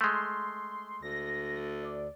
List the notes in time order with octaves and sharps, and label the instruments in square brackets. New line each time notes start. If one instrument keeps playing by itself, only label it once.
[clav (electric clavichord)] G#3 A3 [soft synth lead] C6
[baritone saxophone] D2 [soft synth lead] A#6
[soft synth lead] D5